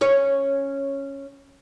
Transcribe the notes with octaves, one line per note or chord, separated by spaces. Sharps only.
C#4 C#5